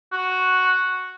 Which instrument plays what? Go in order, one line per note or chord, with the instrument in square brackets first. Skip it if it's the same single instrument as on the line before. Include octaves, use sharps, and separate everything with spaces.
[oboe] F#4